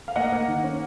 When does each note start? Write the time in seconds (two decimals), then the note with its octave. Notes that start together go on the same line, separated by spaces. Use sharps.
0.08 F5
0.16 A#3 D#5 F#5
0.32 A#3
0.48 D#3
0.63 C#4